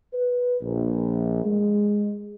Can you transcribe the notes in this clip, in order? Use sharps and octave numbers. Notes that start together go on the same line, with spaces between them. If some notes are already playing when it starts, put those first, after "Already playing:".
B4
A#1
G#3